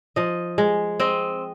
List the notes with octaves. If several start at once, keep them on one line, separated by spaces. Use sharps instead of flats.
F3 D#5
G#3
C4 D#5